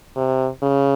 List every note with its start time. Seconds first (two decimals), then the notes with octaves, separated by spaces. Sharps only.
0.16 C3
0.62 C#3